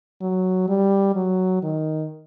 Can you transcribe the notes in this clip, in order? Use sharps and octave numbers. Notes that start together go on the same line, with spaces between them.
F#3
G3
F#3
D#3